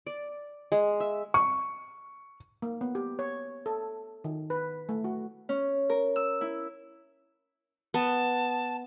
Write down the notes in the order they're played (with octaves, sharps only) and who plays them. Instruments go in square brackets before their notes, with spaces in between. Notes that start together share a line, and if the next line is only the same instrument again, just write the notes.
[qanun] D5
G#3
E5
[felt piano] C#6
[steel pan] A#3
B3
G4
C#5
A4
D#3
B4
A3
F#4
[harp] C#4
A#4
E6
E4
[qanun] B3 [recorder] A5